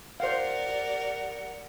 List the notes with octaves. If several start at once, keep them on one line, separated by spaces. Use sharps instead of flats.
G4 A#4 C5 D5 F5 F#5